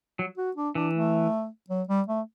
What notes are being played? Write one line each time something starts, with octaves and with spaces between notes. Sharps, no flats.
F#3
F#4
D4
E3 D4
A3
F#3
G3
A3